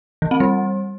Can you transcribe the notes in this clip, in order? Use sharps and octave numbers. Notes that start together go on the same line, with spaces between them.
E3
C4
G3